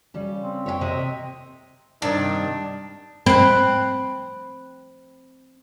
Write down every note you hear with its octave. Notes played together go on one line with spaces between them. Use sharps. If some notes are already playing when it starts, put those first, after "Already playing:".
C#3 G3
C4
C#5 E5 G5
C3 D#5 E5
G2 C3 D#3 D4 D5
C4 B5 F#6